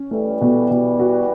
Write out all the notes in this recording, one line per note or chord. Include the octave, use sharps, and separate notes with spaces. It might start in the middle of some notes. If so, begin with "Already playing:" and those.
Already playing: C#4
E3 G3 A3
B2
B2
F#4